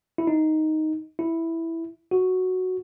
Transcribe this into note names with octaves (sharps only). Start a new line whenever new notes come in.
E4
D#4
E4
F#4